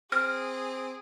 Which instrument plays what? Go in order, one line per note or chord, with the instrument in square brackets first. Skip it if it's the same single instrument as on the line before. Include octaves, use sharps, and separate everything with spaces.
[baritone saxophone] C4 [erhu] G#4 [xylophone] F6